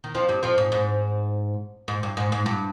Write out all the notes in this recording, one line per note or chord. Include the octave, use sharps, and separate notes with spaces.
D#3
F2 F3
G2 G3
F2 F3
G#2
G#2
G#2
G2
G#2
G#2
G2